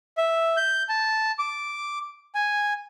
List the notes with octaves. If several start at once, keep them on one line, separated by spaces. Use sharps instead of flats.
E5
G6
A5
D6
G#5